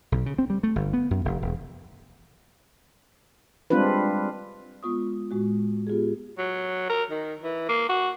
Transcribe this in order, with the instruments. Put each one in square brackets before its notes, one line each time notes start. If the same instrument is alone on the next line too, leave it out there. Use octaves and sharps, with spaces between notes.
[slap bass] B1
C#3
C4
G3
A3
G1
B3
F#2
F1
E1
[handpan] G3 G#3 C4 D4 F4 B4
[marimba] G#3 B3 F4 C#6 D#6
A2 G#3 F#4
B3 F4 G4 G#4
[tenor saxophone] F#3
A#4
D#3
E3
A#3
F#4